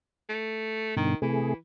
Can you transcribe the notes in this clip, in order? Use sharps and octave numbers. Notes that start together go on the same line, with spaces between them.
A3
G2 B2 D3 D#3
C3 E3 A3 G#4